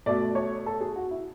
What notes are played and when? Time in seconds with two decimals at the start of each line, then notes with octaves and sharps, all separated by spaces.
0.06 B2 A3 D5
0.35 C#5
0.66 A4
0.81 G#4
0.96 F#4
1.11 E4